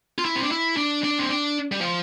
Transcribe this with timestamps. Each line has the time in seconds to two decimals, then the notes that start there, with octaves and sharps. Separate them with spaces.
0.18 F4
0.25 E4
0.36 C4
0.42 D4
0.51 E4
0.77 D4
1.04 D4
1.19 C4
1.29 D4
1.72 G3
1.81 F3